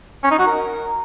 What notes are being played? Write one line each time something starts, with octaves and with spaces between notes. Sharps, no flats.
C#4
D#4
F#4
A#4